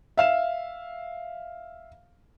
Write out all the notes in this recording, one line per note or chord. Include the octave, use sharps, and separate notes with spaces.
E5 F5 E7